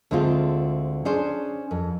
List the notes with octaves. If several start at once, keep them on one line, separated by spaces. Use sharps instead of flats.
D2 D3 G#3 C4 F4
C#4 D4 G#4 C5
F2